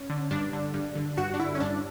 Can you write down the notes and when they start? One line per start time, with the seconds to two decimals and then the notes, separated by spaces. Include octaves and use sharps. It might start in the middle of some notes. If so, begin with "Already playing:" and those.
Already playing: C#4
0.10 D3
0.31 G2 D4
0.53 D3
0.74 G2
0.95 D3
1.17 G2 F#4
1.34 D4
1.39 D3 E4
1.55 C#4
1.60 G2 D4